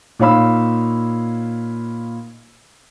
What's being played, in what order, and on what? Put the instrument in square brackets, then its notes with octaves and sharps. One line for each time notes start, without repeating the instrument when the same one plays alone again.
[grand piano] A#2 D#4 C#5 F5 B5 E6